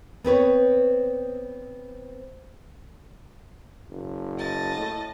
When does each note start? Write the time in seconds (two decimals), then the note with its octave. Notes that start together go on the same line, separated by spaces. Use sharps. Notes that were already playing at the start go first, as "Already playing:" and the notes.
0.25 B3 C4 B4 C#5
3.89 F#1
4.39 D#5 A5
4.76 A2